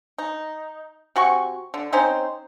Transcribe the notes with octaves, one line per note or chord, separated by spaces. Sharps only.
D#4
C3 F#4 G#5 C#6
D3
C4 C#4 D#4 C5